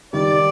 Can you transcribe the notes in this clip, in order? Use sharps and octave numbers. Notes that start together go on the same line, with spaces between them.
D#3 G3 D5